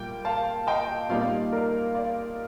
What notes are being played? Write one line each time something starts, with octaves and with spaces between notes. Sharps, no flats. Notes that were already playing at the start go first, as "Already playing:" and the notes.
Already playing: A#2 G3 A#3 G5
F5 A5
D#5 G5
A#2 G3 A#3 D#4 D5 F5
A#4 D5
D5 F5